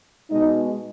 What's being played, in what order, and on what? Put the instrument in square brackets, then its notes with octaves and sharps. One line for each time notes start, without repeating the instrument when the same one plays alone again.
[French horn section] B2 G#3 D#4 D#5